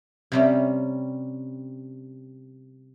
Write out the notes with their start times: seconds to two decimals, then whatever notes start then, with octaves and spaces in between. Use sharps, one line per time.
0.32 C3 G3 C#4